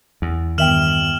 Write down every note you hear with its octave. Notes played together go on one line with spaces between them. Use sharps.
E2
G2 D#3 B3 E5 G5 F6 E7 F#7